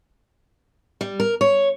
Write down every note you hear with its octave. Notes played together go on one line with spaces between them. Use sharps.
G3
A#4
C#5